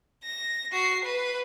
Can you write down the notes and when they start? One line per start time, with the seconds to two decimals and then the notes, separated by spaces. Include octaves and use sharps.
0.24 A#6
0.72 F#4 C7
1.04 B4